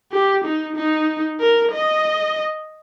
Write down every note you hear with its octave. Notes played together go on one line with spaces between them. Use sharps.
G4
D#4
D#4
A#4
D#5